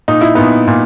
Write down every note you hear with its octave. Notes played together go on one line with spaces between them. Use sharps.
A#2 D#4
E4
A#2 B3 D#4
A#2